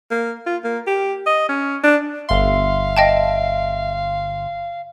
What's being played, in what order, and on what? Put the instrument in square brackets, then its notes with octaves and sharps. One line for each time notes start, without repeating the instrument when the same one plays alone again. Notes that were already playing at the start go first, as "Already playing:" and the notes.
[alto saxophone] A#3
F4
A#3
G4
D#5
C#4
D4
[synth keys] G1 C6 [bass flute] E5 [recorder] F5
[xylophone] D#5 G5 A5